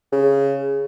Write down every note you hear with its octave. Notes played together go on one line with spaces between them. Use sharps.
C#3